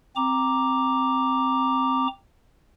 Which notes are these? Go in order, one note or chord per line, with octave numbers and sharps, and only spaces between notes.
C4 A#5 D6